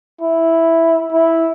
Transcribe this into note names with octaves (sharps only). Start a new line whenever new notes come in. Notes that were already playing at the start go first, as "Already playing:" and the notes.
E4
E4